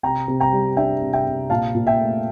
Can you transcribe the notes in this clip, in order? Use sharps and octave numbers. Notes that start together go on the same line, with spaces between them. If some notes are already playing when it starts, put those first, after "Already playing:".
C3 G5 A#5
C3
G5 A#5
G3
D4 E5 G5
C3
E5 G5
C3
A#2 F5 A5
A#2
E5 G5
A3